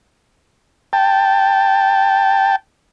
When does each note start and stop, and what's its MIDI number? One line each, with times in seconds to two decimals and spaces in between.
0.93 2.56 79
0.93 2.56 81